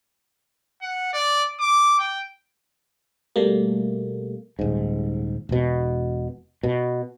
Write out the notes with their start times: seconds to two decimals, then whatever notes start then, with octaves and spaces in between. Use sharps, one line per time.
0.82 F#5
1.13 D5
1.60 D6
1.99 G5
3.36 B2 G3 A3 A#3
4.59 D#1 G#2
5.49 E1 B2
6.63 B2